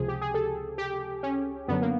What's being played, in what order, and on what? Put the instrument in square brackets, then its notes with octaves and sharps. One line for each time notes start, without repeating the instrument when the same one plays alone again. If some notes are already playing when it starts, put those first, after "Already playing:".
Already playing: [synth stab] C#2 C3 F3 G#4
G4
G#4
A4
G4
C#4
F#2 D3 F#3 B3
A#3